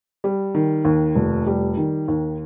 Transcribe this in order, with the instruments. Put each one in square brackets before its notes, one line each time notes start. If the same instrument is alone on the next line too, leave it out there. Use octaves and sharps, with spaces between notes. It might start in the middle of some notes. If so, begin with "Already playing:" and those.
[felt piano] G3
D#3
D#2
F1
G3
D#3
D#2